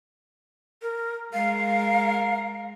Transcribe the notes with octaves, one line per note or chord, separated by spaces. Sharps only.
A#4
G#3 A#4 F5